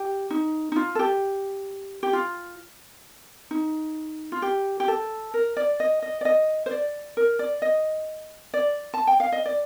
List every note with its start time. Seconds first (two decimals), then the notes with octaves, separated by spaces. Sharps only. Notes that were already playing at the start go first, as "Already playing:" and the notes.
Already playing: G4
0.31 D#4
0.72 D#4
0.76 F4
0.95 A4
0.99 G4
2.03 G4
2.13 F4
3.51 D#4
4.32 F4
4.42 G4
4.80 G4
4.88 A4
5.34 A#4
5.57 D5
5.80 D#5
6.02 D#5
6.21 D5
6.25 D#5
6.66 C5
6.71 D5
7.17 A#4
7.39 D5
7.62 D#5
8.54 D5
8.94 A5
9.07 G5
9.20 F5
9.32 D#5
9.46 D5